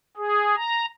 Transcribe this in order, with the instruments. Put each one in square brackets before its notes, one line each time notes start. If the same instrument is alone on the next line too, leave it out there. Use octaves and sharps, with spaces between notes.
[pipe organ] G#4
A#5